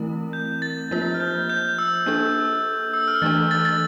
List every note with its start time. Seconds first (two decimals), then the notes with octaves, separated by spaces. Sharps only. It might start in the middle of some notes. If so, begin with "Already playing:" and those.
Already playing: E3 A3 C4 E4 A#4
0.33 G6
0.62 A6
0.91 F3 A#3 F4 C5
1.14 F6
1.20 G6
1.50 G6
1.79 E6
2.06 A#3 D4 A4
2.94 E6
3.08 F6
3.22 E3 A3 D4 A4 A6
3.51 A6
3.65 A6